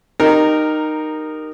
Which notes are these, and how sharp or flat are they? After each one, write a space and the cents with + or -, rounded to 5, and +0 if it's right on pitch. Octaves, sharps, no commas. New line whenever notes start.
D#4 -15 G4 +0 A#4 +0